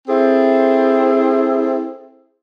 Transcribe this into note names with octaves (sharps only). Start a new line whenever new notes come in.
C4 E4 G#4 A4 C5